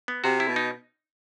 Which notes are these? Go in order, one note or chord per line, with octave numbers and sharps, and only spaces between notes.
B3
C3 F#4
E4
B2
D#4